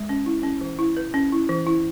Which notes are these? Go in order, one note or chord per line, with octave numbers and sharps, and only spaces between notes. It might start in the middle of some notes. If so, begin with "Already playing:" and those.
Already playing: G#3
C#4
E4
C#4
E3
E4
B4
C#4
E4
E3
E4